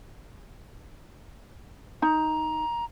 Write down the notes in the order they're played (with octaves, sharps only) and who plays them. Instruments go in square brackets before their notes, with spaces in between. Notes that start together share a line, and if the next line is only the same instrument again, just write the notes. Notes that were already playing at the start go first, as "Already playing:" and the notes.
[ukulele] D#4 [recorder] A#5